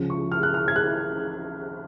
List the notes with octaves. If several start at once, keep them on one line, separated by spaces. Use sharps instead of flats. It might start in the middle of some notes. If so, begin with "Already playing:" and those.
Already playing: C#2 C#3 F3
C#6
F6
F#6
F6
G#6
F#6